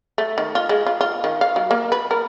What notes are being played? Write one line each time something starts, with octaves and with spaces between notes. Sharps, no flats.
A3
D#3
F4
G#3
F4
F4
D#3
F5
F#3
A#3
B4
A#4